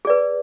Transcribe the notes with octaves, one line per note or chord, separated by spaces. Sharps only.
G#4 B4 D5